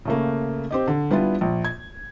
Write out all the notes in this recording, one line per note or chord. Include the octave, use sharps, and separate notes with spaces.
C#3 A3 A#3
C4 G4 D#5
D3
G3 B3 D4 E4 F4
A#1
G#6